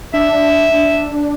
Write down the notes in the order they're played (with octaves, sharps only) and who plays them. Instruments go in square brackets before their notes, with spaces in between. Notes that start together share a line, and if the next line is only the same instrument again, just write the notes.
[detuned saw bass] D4 [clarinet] E5